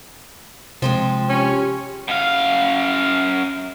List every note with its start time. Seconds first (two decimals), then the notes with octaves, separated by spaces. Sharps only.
0.82 C3 F3 G#3 C4
1.29 C#4 G4
2.08 F#2 F5